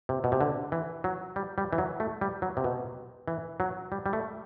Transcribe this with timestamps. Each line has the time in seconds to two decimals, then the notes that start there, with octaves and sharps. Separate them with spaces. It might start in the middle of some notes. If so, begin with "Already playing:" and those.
0.09 C3
0.24 B2
0.32 C3
0.41 D3
0.72 E3
1.04 F#3
1.36 G3
1.58 G3
1.73 E3
1.78 F#3
2.00 A3
2.21 G3
2.42 F#3
2.57 C3
2.64 B2
3.28 E3
3.60 F#3
3.92 G3
4.06 G3
4.13 A3